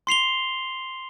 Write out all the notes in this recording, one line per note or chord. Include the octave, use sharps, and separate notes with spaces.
C6 C7 F7 G7